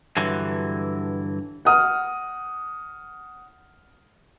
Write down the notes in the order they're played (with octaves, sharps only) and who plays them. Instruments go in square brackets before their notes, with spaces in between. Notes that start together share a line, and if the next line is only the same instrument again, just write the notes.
[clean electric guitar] G2 D3 E3 F#3
[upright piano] F#5 D#6 F6